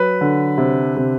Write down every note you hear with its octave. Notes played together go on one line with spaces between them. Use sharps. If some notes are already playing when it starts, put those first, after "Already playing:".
Already playing: F#3 B4
D3
C3
C3